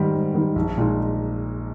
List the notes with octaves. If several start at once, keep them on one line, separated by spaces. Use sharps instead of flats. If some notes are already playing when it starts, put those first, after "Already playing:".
Already playing: G#2 D#3 G3
G#2
D#3 G3
A#1
A#2 G#3 D#4